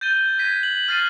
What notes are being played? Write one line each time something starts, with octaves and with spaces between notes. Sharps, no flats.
G6 A6 D#7 G7
F#6 G#6 A#6 B6 D#7
F#7
F6 A6 C7 D#7